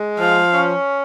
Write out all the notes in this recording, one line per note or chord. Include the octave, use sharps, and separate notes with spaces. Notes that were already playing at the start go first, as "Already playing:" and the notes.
Already playing: G#3
F3 F5
C#4